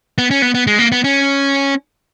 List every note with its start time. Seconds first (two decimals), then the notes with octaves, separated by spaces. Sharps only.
0.18 B3
0.30 C#4
0.42 B3
0.54 B3
0.67 G#3
0.79 A#3
0.92 B3
1.04 C#4